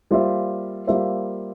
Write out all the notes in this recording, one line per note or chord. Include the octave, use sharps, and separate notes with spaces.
G3 A#3 F4 C5 E5
G3 A#3 F4 C5 E5